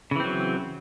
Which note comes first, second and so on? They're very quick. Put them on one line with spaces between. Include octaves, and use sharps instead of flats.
C#3 E3 C4 F#3